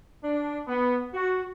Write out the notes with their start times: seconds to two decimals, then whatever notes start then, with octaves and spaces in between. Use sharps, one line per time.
0.23 D4
0.68 B3
1.14 F#4